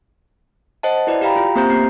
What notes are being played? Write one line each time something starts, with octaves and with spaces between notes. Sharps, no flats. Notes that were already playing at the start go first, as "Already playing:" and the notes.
C5 D#5 F#5 A5
E4 F#4 B4 D5
F#4 G4 F5 G5 A#5 B5
F4
A#3 C4 G4 C5 A#5 G6
A#3 B3 G4 C7